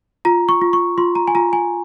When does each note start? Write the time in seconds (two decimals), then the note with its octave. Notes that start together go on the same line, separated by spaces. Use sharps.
0.25 F4 A#5
0.49 C#6
0.61 F4
0.73 C#6
0.98 F4 C6
1.15 A#5
1.28 G#5
1.35 F4 A#5
1.53 G#5